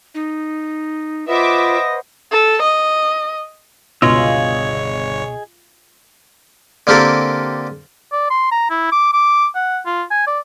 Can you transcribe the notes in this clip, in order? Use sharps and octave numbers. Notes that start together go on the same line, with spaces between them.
D#4
F4 B4 C5 D#5 E5 F#5 D6
A4
D#5
G1 C#2 B2 F4 G#4 C#5 D#5 E6
D3 A#3 C4 G4 A4 A#4
D5
C6
A#5
E4
D6
D6
F#5
F4
G#5
D5